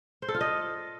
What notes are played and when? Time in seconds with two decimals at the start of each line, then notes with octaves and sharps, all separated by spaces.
0.22 C5
0.28 A4
0.34 F4
0.41 D#5